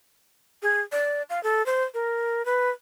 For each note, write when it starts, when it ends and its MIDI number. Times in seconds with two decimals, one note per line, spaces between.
0.62 0.81 68
0.92 1.23 74
1.30 1.42 77
1.43 1.65 69
1.66 1.83 72
1.94 2.45 70
2.46 2.70 71